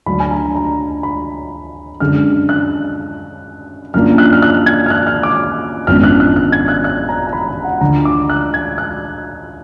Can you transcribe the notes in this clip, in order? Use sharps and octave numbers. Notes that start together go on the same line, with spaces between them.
D2 D3 F#3 D4 B5
G#5
A#5
A#5
B5
F#2 D3 G#3 F6
F#6
F#2 F3 A#3 D4 F6
F#6
F6
F#6
G#6
F6
F#6
F6
D6
G#1 F#2 F3 B3 D4 F6
F#6
F#6
F#6
G#6
F#6
F#6
A#5
A#5
B5
A#5
F#5
D2 D3 F3 A#5
D6
F#6
G#6
F#6